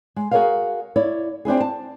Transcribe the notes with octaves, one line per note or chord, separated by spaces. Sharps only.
G#3
F#4 G#4 A#4 B4 C#5 F5
E4 C#5 D5
C4 D4 E4 G#4
A5